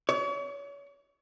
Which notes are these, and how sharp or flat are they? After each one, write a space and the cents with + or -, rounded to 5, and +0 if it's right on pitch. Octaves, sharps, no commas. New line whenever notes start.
C#5 +35